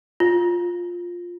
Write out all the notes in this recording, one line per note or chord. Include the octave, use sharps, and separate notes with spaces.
F4